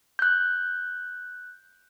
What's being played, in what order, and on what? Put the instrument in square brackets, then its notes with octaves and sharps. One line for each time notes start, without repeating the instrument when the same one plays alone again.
[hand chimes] F#6 G6